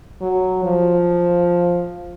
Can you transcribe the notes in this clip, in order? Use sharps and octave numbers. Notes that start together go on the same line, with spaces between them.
F#3
F3